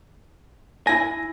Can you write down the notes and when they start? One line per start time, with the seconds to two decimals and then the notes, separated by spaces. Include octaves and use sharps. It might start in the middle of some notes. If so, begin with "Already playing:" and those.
0.87 E4 G#5 A#6